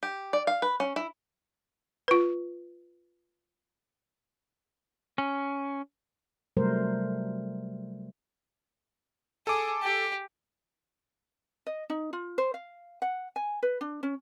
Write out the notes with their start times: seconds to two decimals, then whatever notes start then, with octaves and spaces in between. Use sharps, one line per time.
0.03 G4
0.33 D5
0.47 F5
0.62 B4
0.80 C#4
0.96 E4
2.08 F4 B4
5.18 C#4
6.57 C3 F#3 G3 A3 A#4 C5
9.47 G#4 A4 D6
9.83 G4
11.67 D#5
11.90 D#4
12.13 F4
12.38 C5
12.54 F5
13.02 F#5
13.36 G#5
13.63 B4
13.81 D4
14.03 C#4